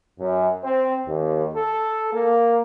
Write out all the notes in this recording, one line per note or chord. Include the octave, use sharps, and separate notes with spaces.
F#2
C4
D#2
A4
A#3